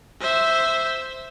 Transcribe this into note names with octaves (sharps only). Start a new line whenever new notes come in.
C5 E5